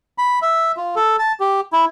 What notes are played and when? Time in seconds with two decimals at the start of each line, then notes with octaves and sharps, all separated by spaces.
0.18 B5
0.42 E5
0.77 F4
0.96 A4
1.19 A5
1.40 G4
1.73 E4